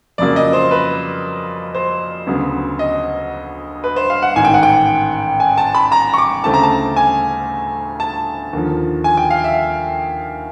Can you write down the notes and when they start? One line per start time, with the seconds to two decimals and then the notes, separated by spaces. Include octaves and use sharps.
0.18 F2 C#3 F#3 A#3 D5
0.36 D#5
0.53 C5
0.71 B4
1.75 C5
2.27 D2 C#3 F#3 B3
2.79 D#5
3.84 B4
3.96 C5
4.10 F5
4.22 F#5
4.36 A1 G#2 D#3 G#5
4.45 G5
4.54 F#5
4.63 G5
5.40 G#5
5.57 A5
5.75 B5
5.92 A#5
6.14 C#6
6.18 D6
6.44 D2 C#3 E3 A3 C4 A5
6.54 A#5
6.63 A5
6.96 G#5
8.00 A5
8.53 D#2 D3 F3
9.04 G#5
9.17 G5
9.30 F5
9.44 E5